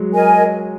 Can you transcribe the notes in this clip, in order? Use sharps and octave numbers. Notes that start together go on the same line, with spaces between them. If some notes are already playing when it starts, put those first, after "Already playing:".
Already playing: F#3 G#3
A#4 D#5 G#5